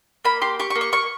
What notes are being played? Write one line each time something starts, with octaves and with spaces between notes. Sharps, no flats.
A#3 B5
G4 C6
G4 C#6
C#6
A#3
C#6
A#3 C#6